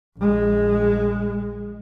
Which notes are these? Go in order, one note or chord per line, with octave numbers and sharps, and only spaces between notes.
A#1 G#3